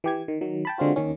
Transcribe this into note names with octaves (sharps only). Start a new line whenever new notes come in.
E3 G4 G#6
D#3
D#3 F#3
G5 A5 B5
D3 G#3 C4 F4 F#4
D#2 D#3 C#4